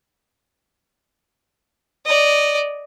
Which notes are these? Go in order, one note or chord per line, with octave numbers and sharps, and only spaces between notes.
D5 D#5